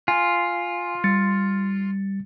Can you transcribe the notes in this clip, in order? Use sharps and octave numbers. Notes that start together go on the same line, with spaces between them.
F4 G#5
G3 A6 C#7